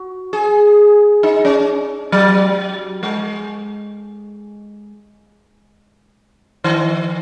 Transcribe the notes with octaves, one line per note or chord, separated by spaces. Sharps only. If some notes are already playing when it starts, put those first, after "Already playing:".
Already playing: F#4
G#4
D#4
C#4
F#3
G#3
D#3